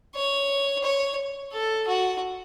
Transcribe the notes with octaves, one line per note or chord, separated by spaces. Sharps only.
C#5
C#5
A4
F#4